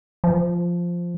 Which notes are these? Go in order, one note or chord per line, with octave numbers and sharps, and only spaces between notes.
F3